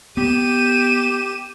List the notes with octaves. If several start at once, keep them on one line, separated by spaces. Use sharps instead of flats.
B3 G4 D#7 E7